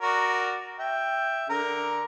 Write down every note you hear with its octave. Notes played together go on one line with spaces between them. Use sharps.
F#4 A#4 D5
E5 G5
D3 A#4